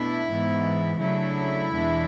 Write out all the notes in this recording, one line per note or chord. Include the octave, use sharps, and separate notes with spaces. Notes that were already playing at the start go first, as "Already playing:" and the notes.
Already playing: B2 A3 D4 E4
G#2 E3 B3
C#3 F#3 A3 D4 E4
E2 B2 G#3 D4